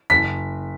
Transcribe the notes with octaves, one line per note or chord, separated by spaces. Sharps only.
F#1 B6